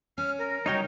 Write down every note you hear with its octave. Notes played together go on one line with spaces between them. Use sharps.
C#4 F6
A#4
C#3 F#3 G3 D#4 C#5 G5